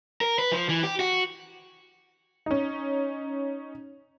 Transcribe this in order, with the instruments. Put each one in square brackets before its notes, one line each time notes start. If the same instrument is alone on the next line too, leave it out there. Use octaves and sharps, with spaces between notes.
[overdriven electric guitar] A#4
B4
F3
E3
G4
F#4
[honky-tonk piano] C#4 D#4